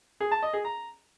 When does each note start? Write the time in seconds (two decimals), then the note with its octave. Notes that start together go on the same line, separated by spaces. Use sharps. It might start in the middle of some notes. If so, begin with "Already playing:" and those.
0.20 G#4
0.31 A5
0.42 D#5
0.53 G#4
0.64 A#5